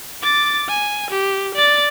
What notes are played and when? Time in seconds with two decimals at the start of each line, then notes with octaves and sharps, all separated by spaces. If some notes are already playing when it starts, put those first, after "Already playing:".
0.22 D6 A6
0.68 G#5
1.10 G4
1.55 D5 A6